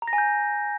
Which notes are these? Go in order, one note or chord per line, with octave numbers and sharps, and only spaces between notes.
A#5
A#6
G#5
G6